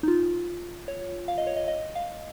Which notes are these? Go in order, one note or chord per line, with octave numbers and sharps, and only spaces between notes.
D#4
F4
C#5
F5
D#5
C#5
D#5
D#5
F5